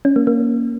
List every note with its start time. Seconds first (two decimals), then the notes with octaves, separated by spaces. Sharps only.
0.05 C#4
0.16 A#3
0.27 A#3